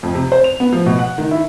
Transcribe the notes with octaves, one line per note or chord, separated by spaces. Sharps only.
F2
C3
C5
F7
B3
F3
B2
F#5
D#3
E4